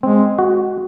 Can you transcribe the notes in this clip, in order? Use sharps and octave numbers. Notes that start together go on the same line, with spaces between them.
G#3 C4
F#4